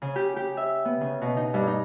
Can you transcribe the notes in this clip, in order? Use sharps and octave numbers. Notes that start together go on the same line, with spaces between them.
C#3
G4
G4
E5
B3
C#3
B2
D#4
G2
D#4